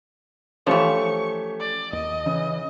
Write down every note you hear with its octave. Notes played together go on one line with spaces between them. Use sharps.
E3 F3 A3 C#4 G4 C#6
D5
D#2 D#5
C#3 E3